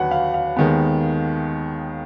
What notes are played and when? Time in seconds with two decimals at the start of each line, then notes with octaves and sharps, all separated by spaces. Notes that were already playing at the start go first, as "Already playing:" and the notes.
Already playing: D#2 D3 F#3 B4 F#5
0.11 F5
0.34 F5
0.56 D#2 D#3 G#3 B3